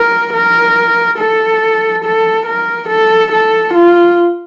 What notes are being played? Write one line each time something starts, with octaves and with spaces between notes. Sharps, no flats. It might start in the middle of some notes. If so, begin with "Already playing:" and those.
Already playing: A#4
A#4
A4
A4
A#4
A4
A4
F4